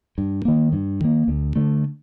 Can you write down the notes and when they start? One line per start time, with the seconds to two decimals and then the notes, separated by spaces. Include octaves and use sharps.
0.18 G2
0.45 D#3 A#3
0.73 G2
1.01 D#3 A#3
1.28 D2
1.56 D3 A3